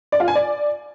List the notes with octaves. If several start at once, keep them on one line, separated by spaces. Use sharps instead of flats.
D5
F4
G#5
D5